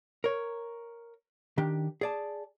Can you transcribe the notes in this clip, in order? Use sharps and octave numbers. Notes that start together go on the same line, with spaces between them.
A#4 C#5
D#3 D4 G4
G#4 D5 A5